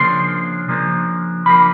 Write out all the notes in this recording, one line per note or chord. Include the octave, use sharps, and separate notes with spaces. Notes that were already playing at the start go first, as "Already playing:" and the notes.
Already playing: C#3 F3 A#3 D4 C6
C#3 F3 A#3 D4
F3 A#3 D4 B5